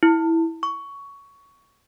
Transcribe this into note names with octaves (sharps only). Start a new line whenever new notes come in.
E4
C#6